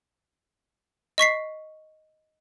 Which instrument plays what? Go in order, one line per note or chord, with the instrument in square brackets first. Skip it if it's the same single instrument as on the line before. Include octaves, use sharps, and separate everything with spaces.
[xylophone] D#5 C#6 B6 C7